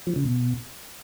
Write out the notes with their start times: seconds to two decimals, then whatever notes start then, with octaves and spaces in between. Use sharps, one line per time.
0.07 F3
0.16 C#3
0.25 B2